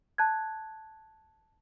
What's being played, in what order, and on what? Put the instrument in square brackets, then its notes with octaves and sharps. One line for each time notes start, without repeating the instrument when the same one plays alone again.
[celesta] A5 F#6 G#6